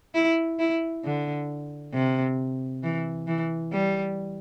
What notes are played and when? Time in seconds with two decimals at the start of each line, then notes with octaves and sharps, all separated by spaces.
0.15 E4
0.59 E4
1.04 D3
1.94 C3
2.83 E3
3.27 E3
3.72 G3